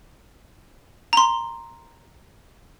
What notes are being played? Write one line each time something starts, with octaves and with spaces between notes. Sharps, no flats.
A#5 C6